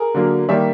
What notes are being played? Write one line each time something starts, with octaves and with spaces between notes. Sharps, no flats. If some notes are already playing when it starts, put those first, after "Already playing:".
Already playing: G#4 A#4
D3 F#3 A#3
D#3 G3 A#3 D5 E5